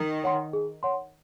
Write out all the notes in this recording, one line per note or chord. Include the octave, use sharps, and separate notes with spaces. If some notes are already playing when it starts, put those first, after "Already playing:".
Already playing: D#3
C#5 F#5 C6
G#4
C#5 F#5 C6